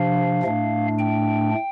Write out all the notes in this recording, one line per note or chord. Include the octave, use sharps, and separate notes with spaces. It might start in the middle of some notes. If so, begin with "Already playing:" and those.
Already playing: C3 F3 D4 F5
A2 A3 D4
G5